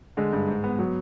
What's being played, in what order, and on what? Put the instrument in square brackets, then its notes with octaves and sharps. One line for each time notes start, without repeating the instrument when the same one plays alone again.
[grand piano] D3 [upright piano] G#3
[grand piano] G2
G#2
B3
[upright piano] F#3 [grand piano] B3